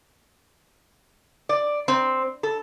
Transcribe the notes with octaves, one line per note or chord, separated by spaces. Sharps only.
D5
C4
A4